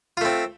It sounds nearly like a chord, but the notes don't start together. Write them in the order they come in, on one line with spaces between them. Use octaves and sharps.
F4 A3 C4